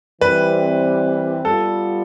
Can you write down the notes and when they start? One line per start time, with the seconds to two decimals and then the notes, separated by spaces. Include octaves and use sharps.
0.21 E3 G3 C4 B4
1.44 G3 B3 F4 A4